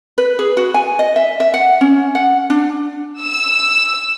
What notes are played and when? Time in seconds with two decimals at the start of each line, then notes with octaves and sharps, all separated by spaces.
0.18 B4
0.39 G#4
0.57 F#4
0.74 G#5
0.99 D#5
1.16 E5
1.40 E5
1.54 F#5
1.81 C#4
2.15 F#5
2.50 D4
3.21 E6